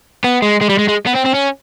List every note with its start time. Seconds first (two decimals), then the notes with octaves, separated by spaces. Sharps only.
0.24 B3
0.42 G#3
0.61 G#3
0.69 G3
0.79 G#3
0.89 G#3
1.07 B3
1.16 C4
1.26 C4
1.35 C#4